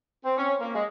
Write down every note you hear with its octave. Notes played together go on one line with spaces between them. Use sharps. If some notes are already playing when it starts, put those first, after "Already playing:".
C4
C#4
A#3
G#3